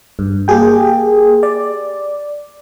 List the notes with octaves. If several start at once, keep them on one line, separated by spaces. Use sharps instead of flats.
G2
A#3 G4 G#4 G5
D5